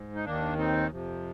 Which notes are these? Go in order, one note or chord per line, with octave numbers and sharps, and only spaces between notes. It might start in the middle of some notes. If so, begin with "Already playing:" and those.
Already playing: G#2
D#4
D#2 D#3 A#3 D4
C4 D#4
F2 C3 F3